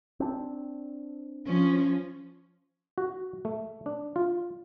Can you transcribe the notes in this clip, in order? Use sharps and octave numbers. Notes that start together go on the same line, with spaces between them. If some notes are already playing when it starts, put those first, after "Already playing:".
C4 D4
F3 C#4
F#4
A3
D4
F4